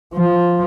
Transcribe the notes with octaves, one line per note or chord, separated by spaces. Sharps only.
F3